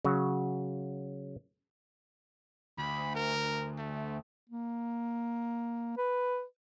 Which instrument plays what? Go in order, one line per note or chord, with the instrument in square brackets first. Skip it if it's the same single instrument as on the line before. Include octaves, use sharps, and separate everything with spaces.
[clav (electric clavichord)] C#3 F#3 F#4
[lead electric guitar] D2 [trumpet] B5
[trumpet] A#4
A3
[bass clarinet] A#3
B4